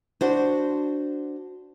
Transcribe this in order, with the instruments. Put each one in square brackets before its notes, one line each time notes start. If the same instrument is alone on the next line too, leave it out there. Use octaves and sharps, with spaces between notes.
[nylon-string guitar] D4 F#4 C5